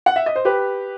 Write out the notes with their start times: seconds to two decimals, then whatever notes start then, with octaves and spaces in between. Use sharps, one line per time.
0.06 F#5
0.16 E5
0.26 D#5
0.36 C5
0.45 G4 B4